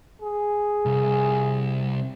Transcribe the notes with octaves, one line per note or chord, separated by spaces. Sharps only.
G#4
C2